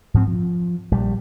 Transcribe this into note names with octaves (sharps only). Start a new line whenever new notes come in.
G#2 F3 C4
F3
A#1 G3